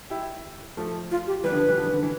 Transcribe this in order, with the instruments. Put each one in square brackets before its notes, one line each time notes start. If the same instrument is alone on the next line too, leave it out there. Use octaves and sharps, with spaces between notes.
[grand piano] E4 G4
F3 A3
[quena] F4
G4
[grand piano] E3 G3 [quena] B4
[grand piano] D3 F3
E3 G3
D3 F3
E3
D3
E3